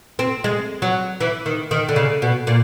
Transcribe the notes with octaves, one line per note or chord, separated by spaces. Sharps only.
C4
G#3
F#3
E3
D#3
D#3
D3
C#3
B2
A#2